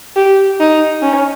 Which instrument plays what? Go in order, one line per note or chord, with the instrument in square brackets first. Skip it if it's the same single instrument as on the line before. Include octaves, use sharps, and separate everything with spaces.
[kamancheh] G4
D#4
C#4